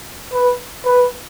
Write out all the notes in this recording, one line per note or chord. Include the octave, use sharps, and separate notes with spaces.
B4
B4